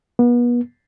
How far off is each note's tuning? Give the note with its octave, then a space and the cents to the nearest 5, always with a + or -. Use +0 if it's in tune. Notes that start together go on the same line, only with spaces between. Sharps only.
B3 -35